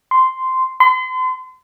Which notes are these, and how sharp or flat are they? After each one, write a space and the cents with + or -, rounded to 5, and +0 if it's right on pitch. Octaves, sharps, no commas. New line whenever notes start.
C6 -10
C6 -40